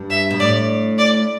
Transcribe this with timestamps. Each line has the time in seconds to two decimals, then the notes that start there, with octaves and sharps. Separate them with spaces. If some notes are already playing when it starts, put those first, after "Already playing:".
Already playing: G2
0.10 E5
0.31 B2
0.40 A2 D5
0.98 D5